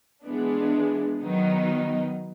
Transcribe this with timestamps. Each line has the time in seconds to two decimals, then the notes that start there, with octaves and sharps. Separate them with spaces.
0.24 E3 G#3 B3 D4
1.20 D#3 F#3 B3 D#4